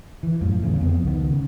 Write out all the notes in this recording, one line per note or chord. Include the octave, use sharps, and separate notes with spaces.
E3
F#2 A2 F3
D1 E2 C#3 A3
F2 B3 C4
C#2 D#3 B3
C#3